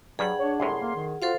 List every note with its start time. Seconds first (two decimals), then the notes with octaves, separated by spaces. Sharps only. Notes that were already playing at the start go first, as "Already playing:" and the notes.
0.19 G2 F#3 G3 G#4 F#5
0.39 D4 C#5
0.60 C2 F#2 A2 C6
0.81 A#3
0.95 D#3
1.22 F4 F#4 A4 C5 F5